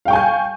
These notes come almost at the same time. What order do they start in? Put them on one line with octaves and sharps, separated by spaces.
F5 G5 C#6 G#5 G6